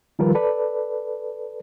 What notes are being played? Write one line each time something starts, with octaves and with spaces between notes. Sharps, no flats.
D#3 F3 G3 F4 A#4 B4
A4 B4 D5